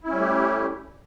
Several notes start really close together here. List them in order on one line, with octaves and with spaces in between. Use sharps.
E4 C#4 G3 A3 G4